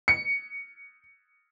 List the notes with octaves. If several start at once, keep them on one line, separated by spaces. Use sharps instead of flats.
C#7